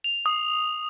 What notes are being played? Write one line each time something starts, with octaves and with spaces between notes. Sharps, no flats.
F7
D#6